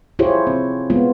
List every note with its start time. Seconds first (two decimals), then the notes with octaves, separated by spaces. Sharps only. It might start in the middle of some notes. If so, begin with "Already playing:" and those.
0.19 E4 F4 G4 G#4 C5 C#5
0.47 C4
0.90 G#3 B3 F4